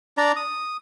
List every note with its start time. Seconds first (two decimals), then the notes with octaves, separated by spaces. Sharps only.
0.17 D4 D5 A#5
0.36 D#6